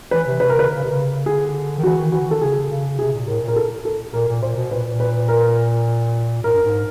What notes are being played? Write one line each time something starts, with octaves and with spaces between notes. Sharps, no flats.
E3 B4
C3
C3 B4
A#4
C#3 B4
D3
C#3
C3
C#3
D3 G#4
D#3
E3 F#4
D#3
E3 F#4
D3
D#3 A4
C#3 G#4
C#3
C3 G#4
A#2
A2 A#4
A#2
A#4
A4
A4
A#2 A#4
A#2
A#2 C5
B2
A#2 B4
B4
A#4
A2 A#4
G2
G#2